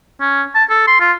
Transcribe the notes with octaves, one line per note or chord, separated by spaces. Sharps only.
C#4
A5
A4
C6
F4